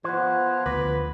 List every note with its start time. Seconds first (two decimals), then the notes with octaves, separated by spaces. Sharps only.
0.04 F3 B3 C5 F#5 F#6 G#6
0.66 D2 B4 D6 A#6